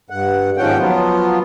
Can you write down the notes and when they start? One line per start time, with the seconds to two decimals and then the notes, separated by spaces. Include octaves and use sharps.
0.10 G2 F#5
0.57 D#2 G#2 F3 C#4 F#5 G5
0.79 F3 F#3 B3 F4